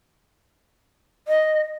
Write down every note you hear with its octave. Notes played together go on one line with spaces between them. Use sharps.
D#5